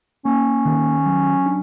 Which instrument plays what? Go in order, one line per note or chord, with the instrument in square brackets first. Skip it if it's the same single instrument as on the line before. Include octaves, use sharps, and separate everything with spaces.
[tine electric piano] A#3 [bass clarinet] C#4
[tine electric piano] D#3
F#3
D4